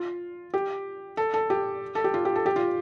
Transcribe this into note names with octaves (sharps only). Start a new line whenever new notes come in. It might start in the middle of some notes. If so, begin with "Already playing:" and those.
Already playing: F4
G4
A4
A4
G4
A4
G4
F4
G4
A4
G4
F4